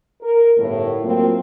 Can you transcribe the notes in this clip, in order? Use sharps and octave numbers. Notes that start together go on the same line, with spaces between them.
A#4
G1 A2
F#3 A#3 C4 F4